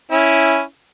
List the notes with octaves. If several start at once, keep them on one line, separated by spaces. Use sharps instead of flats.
C#4 E4